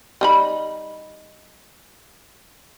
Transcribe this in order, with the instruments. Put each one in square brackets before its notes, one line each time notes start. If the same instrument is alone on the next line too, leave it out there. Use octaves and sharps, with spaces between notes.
[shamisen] G3 D#4 B5